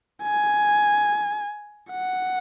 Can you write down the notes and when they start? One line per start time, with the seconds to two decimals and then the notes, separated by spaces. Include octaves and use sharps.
0.23 G#5
1.91 F#5